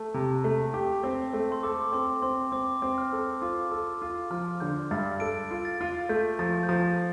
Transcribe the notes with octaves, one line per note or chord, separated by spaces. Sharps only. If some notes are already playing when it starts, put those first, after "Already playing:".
Already playing: A3 A5
C3
A3
G4
C4
A3
C6
A4 D6
D6
C4 C6
C4 C6
C4 D6
C4
F6
A4
F4 D6
A4
F4
F3 F6
D3 G6
G2 A6
A4 D7
F4
A6
F4
A3 G6
F3 A6
G6
F3 A6